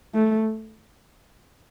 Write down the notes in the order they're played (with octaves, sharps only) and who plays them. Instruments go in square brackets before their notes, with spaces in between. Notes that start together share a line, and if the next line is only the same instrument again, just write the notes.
[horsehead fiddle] A3